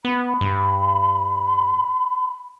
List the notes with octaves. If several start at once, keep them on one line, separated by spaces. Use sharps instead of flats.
B3 B5
G2